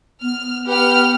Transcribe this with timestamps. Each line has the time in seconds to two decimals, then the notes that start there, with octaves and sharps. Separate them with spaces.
0.22 B3 F6
0.68 G4 B4 F#5 F6